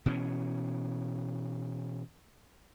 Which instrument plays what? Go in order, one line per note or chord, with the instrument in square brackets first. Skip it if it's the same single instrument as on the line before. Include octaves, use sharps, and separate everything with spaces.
[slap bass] B2 E3 C#4